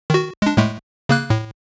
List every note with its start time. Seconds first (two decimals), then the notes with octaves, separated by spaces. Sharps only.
0.10 D#3 F#4
0.42 G#3 D4
0.57 A2 G#3 A3
1.09 C#3 A#3 F#6
1.30 A2